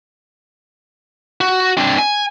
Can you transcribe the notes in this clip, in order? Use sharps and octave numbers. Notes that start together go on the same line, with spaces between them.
F#4
C4 D4
G#5